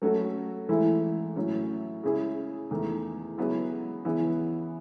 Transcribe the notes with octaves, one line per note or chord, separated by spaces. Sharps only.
F#3 A3 C#4 F#4 A4
G#2 E3 A3 E4
A2 F#3 C#4
C#3 G#3 C#4 E4 G#4
E2 D#3 A3
C#3 F#3 B3 E4
C#3 E3 B3 E4